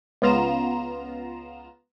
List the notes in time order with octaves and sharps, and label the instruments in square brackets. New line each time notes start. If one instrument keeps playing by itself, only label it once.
[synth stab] C#2 B3 F4 A#5 E7